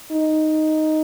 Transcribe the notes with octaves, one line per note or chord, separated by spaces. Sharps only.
D#4